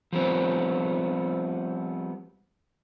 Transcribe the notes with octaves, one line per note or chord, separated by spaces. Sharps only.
F3 G3 B3 C4